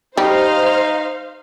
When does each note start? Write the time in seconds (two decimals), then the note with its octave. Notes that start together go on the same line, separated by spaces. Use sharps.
0.17 G3 D#4 C5 F5